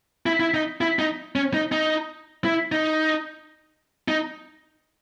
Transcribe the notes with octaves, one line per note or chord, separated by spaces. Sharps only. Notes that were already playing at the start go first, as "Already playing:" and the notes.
E4
E4
D#4
E4
D#4
C#4
D#4
D#4
E4
D#4
D#4